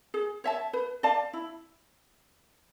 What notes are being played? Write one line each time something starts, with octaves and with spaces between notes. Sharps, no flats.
G#4
C#5 E5 A5
B4
D5 F5 A5
E4